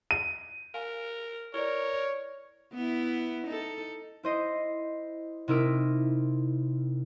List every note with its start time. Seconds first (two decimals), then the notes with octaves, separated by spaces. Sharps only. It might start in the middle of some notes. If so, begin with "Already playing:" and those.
0.11 D#7
0.74 A#4 F5 G#5
1.54 E4 A#4 B4 C#5 D5
2.74 B3 E4
3.47 D#4 A4
4.23 E4 C5 D#5
5.48 C3 D#4 E4 A#4 E6 D7